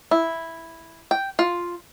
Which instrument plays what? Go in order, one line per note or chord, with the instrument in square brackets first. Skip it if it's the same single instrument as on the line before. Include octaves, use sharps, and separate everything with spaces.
[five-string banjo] E4
G5
F4